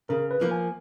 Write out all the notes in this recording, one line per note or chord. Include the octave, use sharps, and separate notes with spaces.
C#3 A#4
B4
F3 A#3
G#5